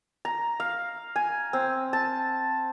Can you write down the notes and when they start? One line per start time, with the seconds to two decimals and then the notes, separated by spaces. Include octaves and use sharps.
0.25 A#5
0.60 F5
1.16 G#5
1.53 C4
1.93 A5